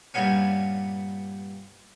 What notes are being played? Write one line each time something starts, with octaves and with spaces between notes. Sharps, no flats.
G2 A#2 G3 B3 C#4